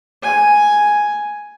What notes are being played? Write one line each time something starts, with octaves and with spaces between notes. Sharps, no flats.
G#5